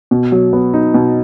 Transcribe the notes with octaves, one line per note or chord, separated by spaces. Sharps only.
B2
F#3
B3
D#4
B2